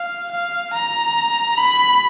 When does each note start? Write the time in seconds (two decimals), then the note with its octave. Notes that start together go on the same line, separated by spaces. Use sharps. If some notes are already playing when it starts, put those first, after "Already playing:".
Already playing: F5
0.32 F5
0.74 A#5
1.58 B5